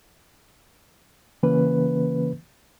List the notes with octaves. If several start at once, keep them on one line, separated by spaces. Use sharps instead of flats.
C#3 E3 A#3 C#4 B4